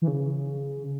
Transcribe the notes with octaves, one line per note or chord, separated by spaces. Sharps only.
E3
C#3